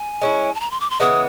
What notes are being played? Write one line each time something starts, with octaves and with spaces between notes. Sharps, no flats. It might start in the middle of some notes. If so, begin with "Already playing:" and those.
Already playing: G#5
G#3 C#4 E4
A5
A#5
C6
D6
C6
C#3 E3 G#3 B3 D#6